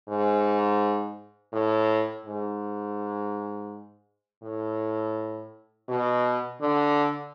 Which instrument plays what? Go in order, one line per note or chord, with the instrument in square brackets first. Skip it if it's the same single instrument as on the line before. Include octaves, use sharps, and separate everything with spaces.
[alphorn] G#2
A2
G#2
A2
B2
D3